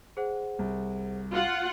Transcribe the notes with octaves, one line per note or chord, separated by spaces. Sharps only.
G#4 C5 F#5
C2
F4 F#5